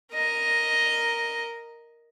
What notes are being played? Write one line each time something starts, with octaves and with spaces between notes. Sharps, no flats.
A#4 D#5